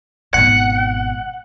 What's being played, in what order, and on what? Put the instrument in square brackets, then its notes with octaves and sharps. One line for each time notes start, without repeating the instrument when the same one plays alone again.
[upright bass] G#1 B2 [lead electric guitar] F#5